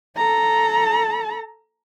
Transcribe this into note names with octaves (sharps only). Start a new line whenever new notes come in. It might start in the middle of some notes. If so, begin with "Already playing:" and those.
A4 A#5